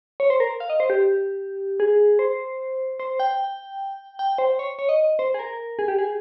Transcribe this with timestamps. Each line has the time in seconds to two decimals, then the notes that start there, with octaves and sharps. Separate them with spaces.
0.20 C#5
0.30 C5
0.40 A#4
0.60 F5
0.70 D#5
0.80 C5
0.90 G4
1.80 G#4
2.19 C5
3.00 C5
3.20 G5
4.19 G5
4.38 C5
4.59 C#5
4.79 C#5
4.89 D#5
5.19 C5
5.34 G#4
5.39 A#4
5.79 G#4
5.88 G4
5.98 G#4